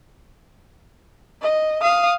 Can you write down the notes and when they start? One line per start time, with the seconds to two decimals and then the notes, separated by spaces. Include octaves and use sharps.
1.42 D#5
1.82 F5 D#6